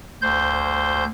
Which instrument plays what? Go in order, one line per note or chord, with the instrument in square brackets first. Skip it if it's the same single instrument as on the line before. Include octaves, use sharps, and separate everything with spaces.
[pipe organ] D2 C5 G6